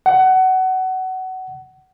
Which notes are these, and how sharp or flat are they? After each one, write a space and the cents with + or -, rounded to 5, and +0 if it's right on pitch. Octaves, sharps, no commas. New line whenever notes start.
F#5 +20